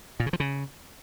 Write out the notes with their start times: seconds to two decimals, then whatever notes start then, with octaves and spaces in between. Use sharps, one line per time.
0.20 A#2
0.26 C#3
0.33 F3
0.40 C#3